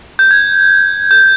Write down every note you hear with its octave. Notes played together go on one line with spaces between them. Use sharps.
G6
G#6
G6